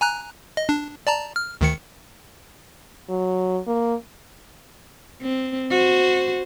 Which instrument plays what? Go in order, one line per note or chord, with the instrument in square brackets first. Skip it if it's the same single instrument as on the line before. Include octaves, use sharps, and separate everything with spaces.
[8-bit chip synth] G#5 A#5 F#6
D#5
D4
D5 A5 A#5
F6
D2 D#3 C#7
[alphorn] F#3
A#3
[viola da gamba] C4
F#4 C5